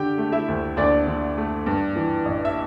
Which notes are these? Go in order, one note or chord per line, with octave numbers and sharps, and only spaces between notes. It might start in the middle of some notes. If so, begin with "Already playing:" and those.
Already playing: D3 G4 G5
A3
E4 E5
D2
D2 D4 D5
D3
A3
G2
E3
A1
E5